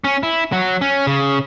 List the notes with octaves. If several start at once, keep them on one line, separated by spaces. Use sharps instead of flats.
C#4
E4
F#3
C#4
C#3